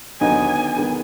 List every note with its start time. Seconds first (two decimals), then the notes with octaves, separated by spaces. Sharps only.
0.20 D#2 D3 F#3 B3 D#4 G#5
0.77 D#3 G#3 B3